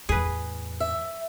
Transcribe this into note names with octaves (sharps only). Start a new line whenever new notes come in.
E2 A2 G#4 B4
E5